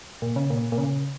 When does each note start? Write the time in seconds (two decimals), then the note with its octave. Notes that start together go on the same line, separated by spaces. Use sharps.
0.22 A#2
0.36 C#3
0.50 A#2
0.72 A#2
0.78 C#3